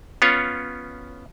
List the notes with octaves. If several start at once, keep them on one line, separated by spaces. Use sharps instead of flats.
B3 C#4 F4 C#5